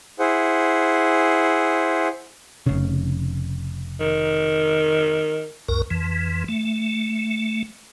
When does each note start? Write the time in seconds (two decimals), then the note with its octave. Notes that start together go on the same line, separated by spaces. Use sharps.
0.19 E4 G#4 C5 F#5
2.66 F1 C#3
4.00 D#3
5.68 C#2 F#2 A#4
5.90 F2 E3
6.48 A3